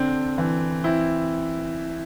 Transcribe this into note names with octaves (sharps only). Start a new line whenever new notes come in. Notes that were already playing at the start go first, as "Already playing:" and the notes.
Already playing: D3 C4 D4
E3
C4 E4